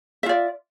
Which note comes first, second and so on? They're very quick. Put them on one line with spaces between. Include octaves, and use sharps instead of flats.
E5 F4 D5